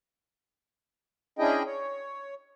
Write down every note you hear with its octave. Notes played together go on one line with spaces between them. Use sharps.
C#4 D4 E4 G#4 D#5 G5
C#5